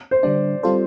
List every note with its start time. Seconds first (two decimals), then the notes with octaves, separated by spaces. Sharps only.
0.11 C5
0.23 D3 G3 D4 D5
0.63 G3 C4 F4 A4 C5